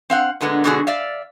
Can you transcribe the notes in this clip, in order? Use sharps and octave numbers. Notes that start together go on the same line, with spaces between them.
C4 F5 F#5
A#2 D3 G#3 B3
G#2 B2 D3 C4 F#4 G#4
D5 E5 F5